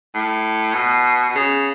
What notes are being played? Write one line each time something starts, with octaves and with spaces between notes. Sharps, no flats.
A2
B2
B2
C#3